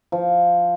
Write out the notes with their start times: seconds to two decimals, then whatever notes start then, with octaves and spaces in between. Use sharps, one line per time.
0.12 F3